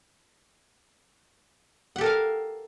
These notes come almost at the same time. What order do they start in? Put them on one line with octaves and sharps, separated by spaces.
F#5 G4 A4 A#4 F5